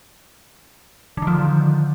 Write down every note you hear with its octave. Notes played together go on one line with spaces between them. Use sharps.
D3 D#3 F3